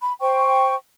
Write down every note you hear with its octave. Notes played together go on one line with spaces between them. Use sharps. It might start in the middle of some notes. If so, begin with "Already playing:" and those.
B5
C5 G5 C#6